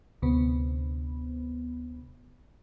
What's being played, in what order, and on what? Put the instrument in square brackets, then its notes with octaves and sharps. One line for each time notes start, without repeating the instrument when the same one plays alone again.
[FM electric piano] D2 C3 B3